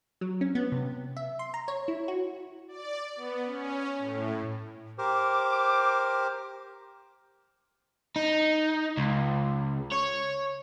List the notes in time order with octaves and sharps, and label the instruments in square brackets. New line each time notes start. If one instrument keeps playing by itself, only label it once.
[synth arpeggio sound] F#3
C#4
B3
C3
E5
C6
A#5
C#5
E4
F#4
[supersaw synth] D5
B3
C#4
A2
[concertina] G4 A#4 C5 [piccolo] D6
[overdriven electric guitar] D#4
C#2
C#5